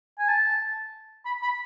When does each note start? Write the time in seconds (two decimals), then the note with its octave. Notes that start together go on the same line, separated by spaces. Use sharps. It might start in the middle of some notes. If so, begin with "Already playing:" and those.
0.19 G#5
0.28 A5
1.25 B5
1.42 B5